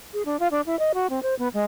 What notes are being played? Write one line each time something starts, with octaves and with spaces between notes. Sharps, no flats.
G#4
D4
F4
D4
E4
D#5
F#4
C4
C5
B3
G#3